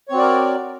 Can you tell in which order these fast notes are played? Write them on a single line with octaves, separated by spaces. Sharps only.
C#5 C4 F#4 D5 A#4